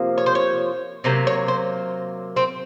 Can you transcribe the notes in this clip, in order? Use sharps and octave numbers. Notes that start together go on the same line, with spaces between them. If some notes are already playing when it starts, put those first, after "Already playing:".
Already playing: C3 F3 A#3
C#5
C5
C#5
C3 F#3 A#3 C5
C#5
C5
C4